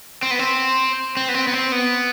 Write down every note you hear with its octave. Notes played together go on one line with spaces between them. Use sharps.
C4
B3
C4
C4
B3
C4
B3
C4
B3